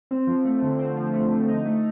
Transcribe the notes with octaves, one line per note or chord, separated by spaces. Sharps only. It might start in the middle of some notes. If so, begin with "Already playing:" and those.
C4
F3
A3
D3
C4
F3
A3
D3
D#4
A3